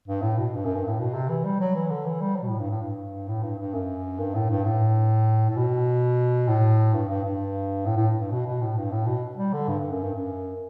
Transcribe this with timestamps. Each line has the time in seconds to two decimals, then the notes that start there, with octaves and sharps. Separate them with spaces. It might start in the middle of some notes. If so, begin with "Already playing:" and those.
0.08 G2
0.22 A2
0.38 B2
0.54 G2
0.65 F#2
0.76 G2
0.87 A2
0.99 B2
1.14 C3
1.29 E3
1.45 G3
1.60 F#3
1.75 E3
1.91 D3
2.06 E3
2.21 G3
2.36 F#3
2.42 B2
2.48 A2
2.59 G2
2.70 A2
2.82 G2
3.28 A2
3.43 G2
3.58 G2
3.74 F#2
4.19 G2
4.35 A2
4.50 G2
4.65 A2
5.50 A2
5.57 B2
6.48 A2
6.93 G2
7.09 G2
7.24 G2
7.86 A2
7.97 A2
8.20 G2
8.32 B2
8.46 B2
8.62 A2
8.77 G2
8.92 A2
9.07 B2
9.37 G3
9.53 D3
9.68 G2
9.80 G2
9.91 F#2
10.03 G2
10.14 F#2